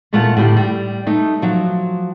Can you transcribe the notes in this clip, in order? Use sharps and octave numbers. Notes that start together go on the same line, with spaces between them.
E2 A#2 A3 F4 F#5 A5
A2 D3 G4
G3
A3 D#4
F3 F#3